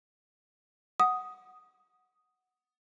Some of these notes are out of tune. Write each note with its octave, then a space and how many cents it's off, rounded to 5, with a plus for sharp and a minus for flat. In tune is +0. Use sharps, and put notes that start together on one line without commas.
F#5 +0 D#6 +0